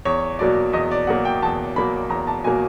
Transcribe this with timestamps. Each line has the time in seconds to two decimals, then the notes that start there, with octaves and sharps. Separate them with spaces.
0.05 E2 C#5
0.39 B2 F#3 A#3 D5
0.73 E2 D#5
0.91 D5
1.07 B2 F#3 A#3 F#5
1.25 G5
1.42 E2 A5
1.76 B2 F#3 A#3 B5
2.09 E2 A#5
2.27 A5
2.44 B2 F#3 A#3 G#5